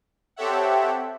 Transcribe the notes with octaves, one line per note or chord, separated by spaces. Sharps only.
C4 G4 A4 C#5 E5 F#5